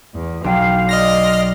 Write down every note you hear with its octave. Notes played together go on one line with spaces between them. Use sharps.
E2
B1 F5 G5
D5 D#5 C6 F6 A#6